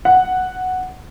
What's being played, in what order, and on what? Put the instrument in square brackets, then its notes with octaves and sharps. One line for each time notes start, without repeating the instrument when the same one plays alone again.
[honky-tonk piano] F#5